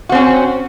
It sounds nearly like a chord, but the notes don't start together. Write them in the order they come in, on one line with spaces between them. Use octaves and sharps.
F#4 C4 C#4